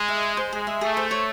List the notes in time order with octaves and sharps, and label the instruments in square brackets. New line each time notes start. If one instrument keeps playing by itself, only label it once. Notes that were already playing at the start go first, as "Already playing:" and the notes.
Already playing: [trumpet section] G#3
[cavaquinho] E5
G#4
C5
[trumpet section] G#3 [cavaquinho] G#4
[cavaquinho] E5
[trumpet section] A3 [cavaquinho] G#4
[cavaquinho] C5
C#5